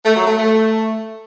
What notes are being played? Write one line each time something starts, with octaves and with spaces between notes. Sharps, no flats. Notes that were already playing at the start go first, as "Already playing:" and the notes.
A3
F#3
A3
A3